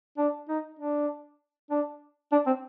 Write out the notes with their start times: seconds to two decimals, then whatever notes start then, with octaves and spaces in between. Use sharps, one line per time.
0.18 D4
0.49 D#4
0.79 D4
1.71 D4
2.32 D4
2.47 C4